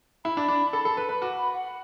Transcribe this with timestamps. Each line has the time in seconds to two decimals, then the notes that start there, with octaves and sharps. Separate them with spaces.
0.25 E4 B5
0.37 D4
0.48 D4
0.73 A4
0.85 A4
0.97 B4
1.09 B4
1.21 F#4 D6
1.38 B5
1.54 F#5